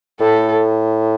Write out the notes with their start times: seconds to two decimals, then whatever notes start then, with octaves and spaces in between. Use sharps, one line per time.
0.20 A2 A4